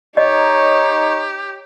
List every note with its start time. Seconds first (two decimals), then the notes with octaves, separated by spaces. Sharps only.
0.17 D#4 G4 C#5 D#5